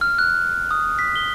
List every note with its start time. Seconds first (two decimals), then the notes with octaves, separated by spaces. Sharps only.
0.01 F6
0.19 F#6
0.71 D#6
0.99 B6
1.16 G7